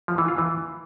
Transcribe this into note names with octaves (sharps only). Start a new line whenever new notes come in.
F3
E3
F4
E3